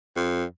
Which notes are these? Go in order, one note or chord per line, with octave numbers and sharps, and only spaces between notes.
F2